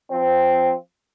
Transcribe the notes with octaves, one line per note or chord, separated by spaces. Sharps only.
F3 C4